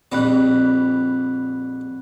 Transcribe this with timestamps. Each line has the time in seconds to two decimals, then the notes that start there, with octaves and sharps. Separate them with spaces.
0.12 A#1 F2 G3 C4 B5 F#6